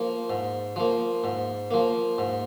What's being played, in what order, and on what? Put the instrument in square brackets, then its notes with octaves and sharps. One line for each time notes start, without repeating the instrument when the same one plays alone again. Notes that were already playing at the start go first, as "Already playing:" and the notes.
Already playing: [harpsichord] F3 A#3
G#2
F3 A#3
G#2
F3 A#3
G#2